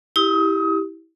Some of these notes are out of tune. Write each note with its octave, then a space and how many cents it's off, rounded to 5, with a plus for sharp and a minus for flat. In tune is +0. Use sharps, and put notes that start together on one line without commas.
E4 -15 G4 +0 D#6 +30